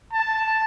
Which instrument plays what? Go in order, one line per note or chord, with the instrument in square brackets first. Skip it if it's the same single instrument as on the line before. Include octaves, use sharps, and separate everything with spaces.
[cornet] A5